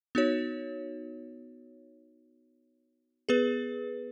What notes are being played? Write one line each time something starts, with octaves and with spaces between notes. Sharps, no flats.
B3 D#4 F#4 C#5
B3 G#4 B4